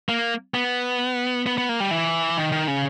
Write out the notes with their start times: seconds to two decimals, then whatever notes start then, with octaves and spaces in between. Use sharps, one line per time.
0.09 A#3
0.54 B3
1.46 B3
1.58 B3
1.69 A#3
1.80 G3
1.91 E3
2.37 D#3
2.52 D#3
2.68 C#3